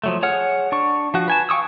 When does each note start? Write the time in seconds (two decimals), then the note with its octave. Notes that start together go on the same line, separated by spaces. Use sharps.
0.04 F3 F#3 A3
0.22 G#4 C#5 F#5 F6
0.72 D4 C#6
1.14 F3 F#4
1.28 B4 G#5 A5
1.49 F5 G5 C#6 D#6 E6